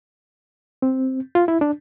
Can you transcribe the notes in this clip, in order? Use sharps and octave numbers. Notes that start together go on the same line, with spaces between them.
C4
F4
E4
D4